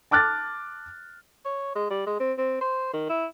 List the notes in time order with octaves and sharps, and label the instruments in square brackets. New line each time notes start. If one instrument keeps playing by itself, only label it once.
[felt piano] A5 D6 F6 F#6 A6
[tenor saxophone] C#5
G#3
G3
G#3
C4
C4
C5
D#3
E4